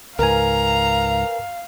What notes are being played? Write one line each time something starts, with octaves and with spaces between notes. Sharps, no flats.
C#2 G#2 A#4 B4 F5 G#5 A#5